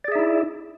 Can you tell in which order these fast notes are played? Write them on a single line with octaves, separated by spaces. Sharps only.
D5 G#4 E5 D#4 E4